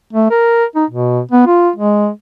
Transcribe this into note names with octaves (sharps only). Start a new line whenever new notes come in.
A3
A#4
D#4
B2
B3
F4
G#3